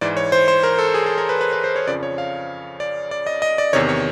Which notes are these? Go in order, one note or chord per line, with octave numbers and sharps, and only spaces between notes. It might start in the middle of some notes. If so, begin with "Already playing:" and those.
G#2 E3 D5
C#5
C5
C5
A#4
A4
G#4
A4
A#4
B4
B4
B4
C5
C#5
F2 C#3 F3 D5
C#5
F5
D5
D5
D#5
D#5
D5
E2 C3 D#3 C#5
C#5